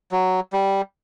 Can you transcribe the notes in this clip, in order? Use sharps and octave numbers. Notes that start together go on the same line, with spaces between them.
F#3
G3